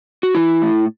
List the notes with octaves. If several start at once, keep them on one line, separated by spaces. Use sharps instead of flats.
F#4
E3 E4
A2